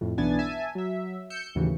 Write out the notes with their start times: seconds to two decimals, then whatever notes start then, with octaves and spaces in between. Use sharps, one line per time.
0.01 F2 A2
0.18 B1 E3 B3 D4 G#5 A6
0.39 E5 G#5 A5
0.75 F#3 E5
1.30 E6 G6 C#7
1.55 D#2 A2 C#3 E3 F#3